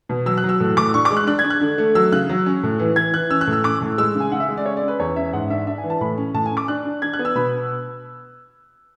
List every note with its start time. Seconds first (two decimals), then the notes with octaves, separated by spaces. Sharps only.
0.09 B2
0.26 F#3 E6
0.38 F#6
0.44 F#3
0.49 E6
0.60 A2
0.77 A2 D6
0.94 D4 C#6
1.05 D6
1.11 G#3
1.17 F#6
1.27 D4 F#6
1.39 G#6
1.44 D4
1.50 F#6
1.61 D3
1.78 A3
1.95 F#3 E6
2.12 C#3 F#6
2.29 F#3
2.46 C#4
2.63 A2
2.79 E3
2.96 E3 G#6
3.14 E3 F#6
3.30 C#4 E6
3.41 F#6
3.47 A2
3.53 E6
3.64 C#4 D6
3.81 A2
3.98 G#3 E6
4.15 C#3
4.20 G#5
4.32 C#3 F#5
4.40 E5
4.49 G#3
4.57 D5
4.66 C#4 C#5
4.77 D5
4.83 C#4
4.88 B4
4.99 E2 C#5
5.16 C#4 E5
5.33 G#2 F#5
5.50 D4 E5
5.67 D4 E5
5.78 G#5
5.84 E3
5.90 A5
6.01 A2 B5
6.18 C#4
6.34 A2 A5
6.46 G#5
6.51 C#4
6.57 D6
6.68 D4 F#6
6.85 D4
7.02 D4 G#6
7.13 F#6
7.19 B3
7.25 E6
7.35 B2 B5